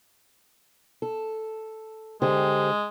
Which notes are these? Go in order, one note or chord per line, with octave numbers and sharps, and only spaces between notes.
A4
D3 G#3 G4 C5